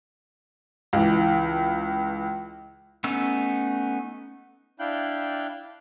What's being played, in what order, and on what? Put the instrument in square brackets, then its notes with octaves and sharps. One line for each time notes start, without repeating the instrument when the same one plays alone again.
[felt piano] C#2 E3
[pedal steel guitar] A3 B3 C#4 D#4 E6
[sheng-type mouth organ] D4 E4 F5 G5 F#6 G6